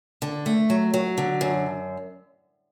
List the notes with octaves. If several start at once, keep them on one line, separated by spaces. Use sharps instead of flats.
D3
A3
F#3
F#3
D3
F#2